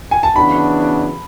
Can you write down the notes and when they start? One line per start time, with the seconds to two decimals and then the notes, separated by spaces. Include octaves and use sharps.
0.11 G#5
0.23 A5
0.36 C#3 E3 B3 D4 F#4 B5